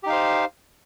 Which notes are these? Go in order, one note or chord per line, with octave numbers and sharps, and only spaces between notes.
D#4 G4 C5 F5